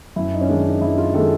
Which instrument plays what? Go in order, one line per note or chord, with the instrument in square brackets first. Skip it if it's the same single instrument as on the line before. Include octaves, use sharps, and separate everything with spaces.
[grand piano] F#2 [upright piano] E4
[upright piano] D#4
C#4
[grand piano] D#3 G#3 [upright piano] D4
[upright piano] D#4
[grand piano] F#2 [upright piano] E4
[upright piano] F4
[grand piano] D#3 G#3 [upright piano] A4